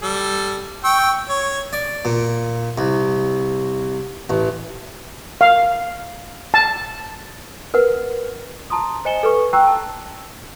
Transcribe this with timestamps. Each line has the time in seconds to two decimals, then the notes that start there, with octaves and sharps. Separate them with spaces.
0.02 G3 A4
0.84 G5 C#6 E6
1.29 C#5
1.73 D5
2.05 A#2
2.78 C2
4.30 A1
5.41 F5
6.54 A5
7.74 A#4 B4 F#5
8.70 A5 A#5 C6 D#6
9.05 C5 D#5 G#5 C#7 E7 G7
9.23 A4 B4 C#6
9.53 G5 A#5 C#6 E6 F#6
9.67 A5